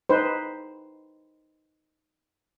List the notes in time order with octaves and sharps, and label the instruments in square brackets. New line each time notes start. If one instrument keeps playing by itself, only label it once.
[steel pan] D#4 B4 C5